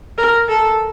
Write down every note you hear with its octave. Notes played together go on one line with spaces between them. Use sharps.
A#4
A4